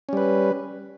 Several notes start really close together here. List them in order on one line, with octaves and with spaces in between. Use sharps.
C#4 G3 B4